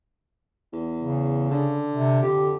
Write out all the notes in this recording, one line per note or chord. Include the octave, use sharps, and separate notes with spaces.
E2
C#3
D3
C3
F2 D3 G4